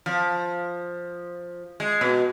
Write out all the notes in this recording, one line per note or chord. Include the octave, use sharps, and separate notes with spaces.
F3
G#3
B2